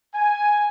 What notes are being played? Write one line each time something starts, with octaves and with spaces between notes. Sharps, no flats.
G#5